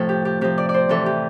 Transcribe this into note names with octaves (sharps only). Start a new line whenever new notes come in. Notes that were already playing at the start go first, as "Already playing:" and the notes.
Already playing: A2 C3 F3 A4
G4
G4
C3 F3 G4
D5
D5
C5
C3 E3 A4
G4